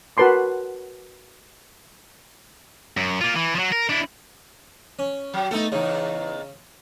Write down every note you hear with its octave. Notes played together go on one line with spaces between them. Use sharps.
F#4 A#4 B4 A5 C6 D6
F#2
A#3 F4
E3
F3 F#3
A#4
D4 E4
C#4
F#3
A3 B3 D#4 A4
E2 C#3 D#4